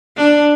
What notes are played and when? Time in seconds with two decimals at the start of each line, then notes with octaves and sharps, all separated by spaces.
0.17 D4